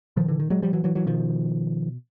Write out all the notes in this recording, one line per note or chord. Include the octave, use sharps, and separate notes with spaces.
A#2 D#3 F3
D3 E3
D#3
F#3 G#3
F3 G3
E3 F#3
E3 F#3
E3 F#3
B2 D#3 F3